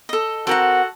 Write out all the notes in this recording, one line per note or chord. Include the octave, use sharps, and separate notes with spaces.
A4 D#5
C4 F#4 A4 A#4 F#5